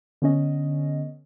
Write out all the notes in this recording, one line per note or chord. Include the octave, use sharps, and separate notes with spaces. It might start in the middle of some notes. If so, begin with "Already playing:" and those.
D3 B3 C#4 D#5